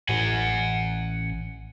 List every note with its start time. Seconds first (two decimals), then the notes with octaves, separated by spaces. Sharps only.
0.09 A1 F#5 G#5